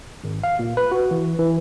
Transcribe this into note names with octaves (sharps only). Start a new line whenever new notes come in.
G#1
F5
A#2
B4
F#4
E3
E3